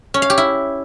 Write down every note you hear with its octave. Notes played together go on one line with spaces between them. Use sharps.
C#4
F5
G4
E4